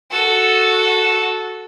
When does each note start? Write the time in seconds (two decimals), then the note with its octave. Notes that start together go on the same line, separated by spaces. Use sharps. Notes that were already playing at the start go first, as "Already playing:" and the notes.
0.12 F#4 A4